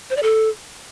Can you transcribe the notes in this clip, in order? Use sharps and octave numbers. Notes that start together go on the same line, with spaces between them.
C5
D5
A4